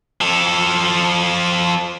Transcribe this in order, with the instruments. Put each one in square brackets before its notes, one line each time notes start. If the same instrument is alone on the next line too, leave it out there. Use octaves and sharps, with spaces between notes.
[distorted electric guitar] F3 A4